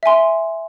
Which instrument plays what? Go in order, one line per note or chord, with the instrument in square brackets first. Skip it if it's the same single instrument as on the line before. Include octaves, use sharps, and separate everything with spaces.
[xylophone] E5 G#5 C6